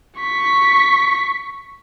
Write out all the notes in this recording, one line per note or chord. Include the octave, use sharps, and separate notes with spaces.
C#6 B6